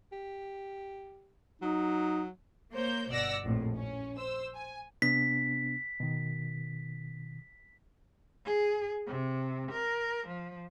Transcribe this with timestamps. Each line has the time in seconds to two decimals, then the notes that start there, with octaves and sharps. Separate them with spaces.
0.12 G4
1.62 F#3 D#4
2.72 A#3 C5 C#5 G6
3.09 G1 B2 D5 F#5 E6 A#6
3.44 A#1 F2 A2
3.76 C#4
4.17 C5 E6
4.55 G#5
5.02 C3 B3 D4 B6
6.00 B2 D#3
8.46 G#4
9.07 C3
9.72 A#4
10.28 F3